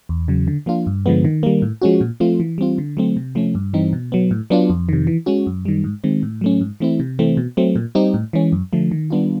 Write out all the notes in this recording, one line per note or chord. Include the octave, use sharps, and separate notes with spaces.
E2
C#3 F#3
D3
F3 A#3 D4 F4
G2
D3 F3 G#3 B3
D#3
G3 A#3
A2
F3 G#3 C#4 F#4
A#2
F3 A3 C4 F4
E3
G3 C4 F4
D3
F#3 A3 C4
C3
F3 A3 C#4
G2
E3 G3 C4 D#4
B2
F#3 B3
A2
F#3 B3 D4 F4
F2
C3 D#3
E3
G#3 C#4 F#4
F#2
D#3 G3
G#2
D#3 G#3 C4
A2
F#3 A3 C#4
G#2
E3 A3 C4 E4
C3
E3 A3 C4
B2
F#3 A3 C4
A#2
G3 C4 D#4 G4
A2
E3 G#3 C#4
F#2
D3 F3 A3
D#3
G3 B3 D4 F4